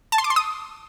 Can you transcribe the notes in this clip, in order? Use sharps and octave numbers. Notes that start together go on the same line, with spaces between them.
A5
C6
D6
C6
D#6